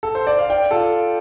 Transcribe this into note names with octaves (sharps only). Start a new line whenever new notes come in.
A4
C5
D5
F5
D5 G5
F4 A4